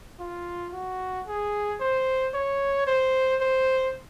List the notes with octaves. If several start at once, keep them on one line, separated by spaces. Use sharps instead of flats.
F4
F#4
G#4
C5
C#5
C5
C5